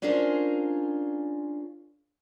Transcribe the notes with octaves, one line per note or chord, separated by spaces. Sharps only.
C#4 D4 F4 G#4 A#4 C5